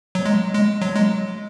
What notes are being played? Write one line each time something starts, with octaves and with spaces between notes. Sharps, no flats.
F#3
G#3
G#3
F#3
G#3